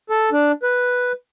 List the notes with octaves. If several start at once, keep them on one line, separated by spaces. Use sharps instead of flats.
A4
D4
B4